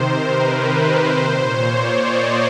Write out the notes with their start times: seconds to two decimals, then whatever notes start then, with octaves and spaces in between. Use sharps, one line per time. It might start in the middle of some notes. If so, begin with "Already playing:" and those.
Already playing: C3 D#3 A#4 C5
0.21 B4
0.50 C5
1.10 A#2 C5
1.39 C#5
1.68 D5
1.98 D#5